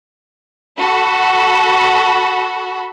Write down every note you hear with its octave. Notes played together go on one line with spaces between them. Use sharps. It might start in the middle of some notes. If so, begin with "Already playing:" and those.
F#4 A4 B5